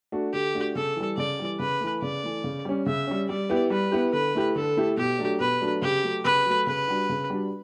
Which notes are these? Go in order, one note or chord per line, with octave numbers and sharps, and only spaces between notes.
A3 D4 F#4
D3 G4
A3 D4 F#4
C#3 A4
E3 G3
C#3 D5
E3 G3
C#3 B4
E3 A3
C#3 D5
E3 A3
C#3
G3 C#4
C#3 E5
G3 C#4
G3 D5
B3 E4 G4
G3 B4
B3 E4 G4
D3 B4
A3 E4 G4
D3 A4
A3 E4 G4
B2 G4
F#3 A3 D4
B2 B4
F#3 A3 D4
C#3 G4
F#3 A3
C#3 B4
F#3 A3
C#3 B4
G3 D4 F#4
C#3
G3 D4 F#4